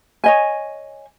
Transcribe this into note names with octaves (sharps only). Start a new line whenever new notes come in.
C#5 D#5 G#5